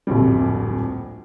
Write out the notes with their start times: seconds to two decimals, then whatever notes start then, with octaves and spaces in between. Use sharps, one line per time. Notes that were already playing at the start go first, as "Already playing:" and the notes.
0.07 D1 A#1 F2 G3